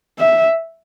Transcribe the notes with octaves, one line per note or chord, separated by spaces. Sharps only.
E5